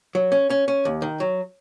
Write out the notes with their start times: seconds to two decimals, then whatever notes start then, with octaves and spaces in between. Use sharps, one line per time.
0.15 F#3
0.32 C#4
0.50 C#4
0.68 C#4
0.85 D#2
1.02 D#3
1.20 F#3